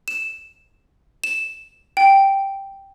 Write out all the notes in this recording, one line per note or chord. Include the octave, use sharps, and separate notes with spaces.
E7
E7
G5